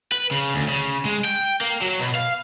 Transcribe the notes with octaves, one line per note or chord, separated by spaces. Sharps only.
B4
C#3
D2
C#3
G#3
G5
A#3
F#3
B2
F5